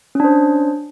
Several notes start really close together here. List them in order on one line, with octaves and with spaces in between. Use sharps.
C#4 D4 C5